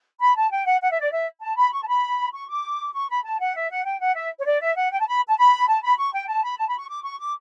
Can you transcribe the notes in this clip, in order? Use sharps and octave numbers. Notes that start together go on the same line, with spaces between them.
B5
A5
G5
F#5
F#5
E5
D5
E5
A5
B5
C#6
A5
B5
C#6
D6
C#6
B5
A5
F#5
E5
F#5
G5
F#5
E5
C#5
D5
E5
F#5
G5
A5
B5
A5
B5
A5
B5
C#6
G5
A5
B5
A5
B5
C#6
D6
C#6
D6